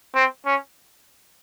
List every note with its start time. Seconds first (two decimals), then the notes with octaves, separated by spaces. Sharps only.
0.15 C4
0.46 C#4